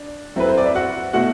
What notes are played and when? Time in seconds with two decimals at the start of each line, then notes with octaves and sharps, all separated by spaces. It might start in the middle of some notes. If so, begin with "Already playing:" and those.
Already playing: D4
0.36 F#3 C4 E4 B4
0.49 C5
0.58 D5
0.66 E5
0.75 F#4 F#5
1.13 B2 A3 E4 F#4 F#5